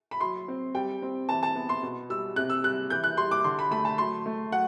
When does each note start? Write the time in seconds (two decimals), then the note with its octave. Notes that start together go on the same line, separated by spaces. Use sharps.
0.11 B5
0.20 F#3 C6
0.48 C4
0.75 G3 G5
1.02 C4
1.29 E3 A5
1.43 A5
1.55 B3
1.69 C6
1.83 B2
2.10 G3 E6
2.36 C3 F#6
2.50 E6
2.64 G3 F#6
2.90 E3 G6
3.04 F#6
3.17 G3 C6
3.31 D6
3.44 D3 C6
3.59 B5
3.71 A3 B5
3.85 A5
3.98 F#3 C6
4.26 A3
4.52 F#3 F#5